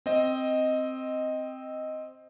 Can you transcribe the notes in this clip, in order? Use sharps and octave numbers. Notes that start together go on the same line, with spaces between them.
C4 D#5